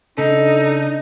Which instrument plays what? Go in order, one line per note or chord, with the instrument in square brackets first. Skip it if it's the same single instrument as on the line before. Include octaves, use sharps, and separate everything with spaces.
[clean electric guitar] C#3 [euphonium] D4 [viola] D#4 [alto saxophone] A4